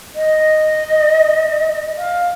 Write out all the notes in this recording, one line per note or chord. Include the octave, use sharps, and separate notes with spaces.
D#5
F5